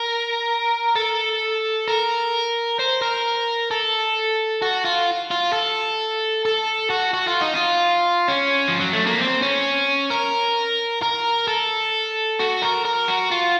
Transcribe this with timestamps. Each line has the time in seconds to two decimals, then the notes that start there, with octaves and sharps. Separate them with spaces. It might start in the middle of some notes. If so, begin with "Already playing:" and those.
Already playing: A#4
0.96 A4
1.88 A#4
2.79 C5
3.02 A#4
3.71 A4
4.62 F#4
4.85 F4
5.31 F4
5.53 A4
6.45 A4
6.90 F#4
7.14 F#4
7.27 F4
7.41 D#4
7.54 F4
8.28 C#4
8.68 F3
8.80 F#3
8.93 A3
9.07 A#3
9.20 C4
9.42 C#4
10.10 A#4
11.02 A#4
11.48 A4
12.39 F#4
12.62 A#4
12.85 A#4
13.08 F#4
13.31 F4